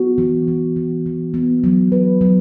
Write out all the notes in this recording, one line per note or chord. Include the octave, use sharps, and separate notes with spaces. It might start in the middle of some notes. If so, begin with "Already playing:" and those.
Already playing: B3 F#4
E3
E3
E3
E3
B3
F#3
B4
F#3